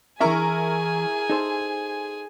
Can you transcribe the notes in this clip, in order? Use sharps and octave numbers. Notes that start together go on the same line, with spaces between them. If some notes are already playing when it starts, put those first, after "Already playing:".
E3 E4 G#4 A#4 E5 G#5 C#6
D#4 A4 C5